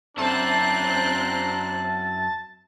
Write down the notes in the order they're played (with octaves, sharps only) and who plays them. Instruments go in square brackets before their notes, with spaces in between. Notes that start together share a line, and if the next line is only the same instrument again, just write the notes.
[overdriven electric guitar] F#2 E4 [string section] C4 F#6 [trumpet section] D4 A#5 C6 [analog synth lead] A5